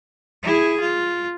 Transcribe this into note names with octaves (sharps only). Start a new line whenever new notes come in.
E4 G#4
F4